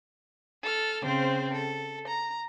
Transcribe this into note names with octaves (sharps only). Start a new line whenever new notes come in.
A4 F6
C#3 C4 C5
A4
A#5